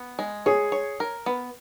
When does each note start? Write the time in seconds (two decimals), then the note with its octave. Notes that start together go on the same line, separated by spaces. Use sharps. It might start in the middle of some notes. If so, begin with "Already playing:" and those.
Already playing: B3
0.19 G#3
0.46 G#4 C#5
0.72 C#5
1.00 A#4
1.26 B3